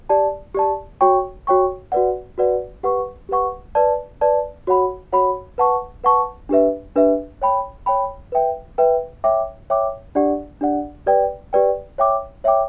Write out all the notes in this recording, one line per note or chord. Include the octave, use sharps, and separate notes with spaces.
G4 D5 A5
G4 D5 A5
F#4 C#5 G5 C#6
F#4 C#5 G5 C#6
F#4 B4 D5 F#5
F#4 B4 D5 F#5
G4 B4 F#5 C#6
G4 B4 F#5 C#6
B4 D5 A5
B4 D5 A5
F#4 C#5 F#5 B5
F#4 C#5 F#5 B5
B4 F#5 A5 C#6
B4 F#5 A5 C#6
D4 G4 B4 E5
D4 G4 B4 E5
C#5 G5 B5
C#5 G5 B5
B4 E5 G5
B4 E5 G5
C#5 E5 G5 D6
C#5 E5 G5 D6
D4 G4 D5 F#5
D4 G4 D5 F#5
G4 B4 D5 G5
G4 B4 D5 G5
C#5 E5 G5 D6
C#5 E5 G5 D6